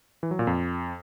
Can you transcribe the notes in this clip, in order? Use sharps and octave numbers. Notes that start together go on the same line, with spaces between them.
E3
F#3
A#2
F2